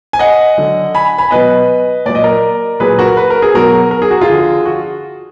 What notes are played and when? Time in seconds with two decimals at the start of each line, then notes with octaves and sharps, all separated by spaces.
0.13 G#5
0.19 D#5 F#5
0.58 D3 F#3
0.95 G#5 B5
1.18 G#5 B5
1.31 B2 F#3 B4 D#5
2.06 A#2 F#3 D5
2.15 D#5
2.24 A#4 D5
2.80 A#2 F#3 G#4 B4
2.99 F#4 A#4
3.17 B4
3.30 A#4
3.42 G#4
3.54 B2 F#3 F#4 A#4
3.91 A#4
4.02 G#4
4.11 F#4
4.21 F4 G#4
4.29 D3 F3
4.66 F#4